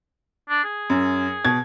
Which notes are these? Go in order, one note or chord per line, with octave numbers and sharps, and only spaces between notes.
D4
G#4
F#2
B2 G#6